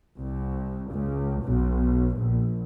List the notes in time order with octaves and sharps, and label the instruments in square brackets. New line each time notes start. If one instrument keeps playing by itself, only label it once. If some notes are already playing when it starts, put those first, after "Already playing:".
[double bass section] C2
C#2
B1
A#1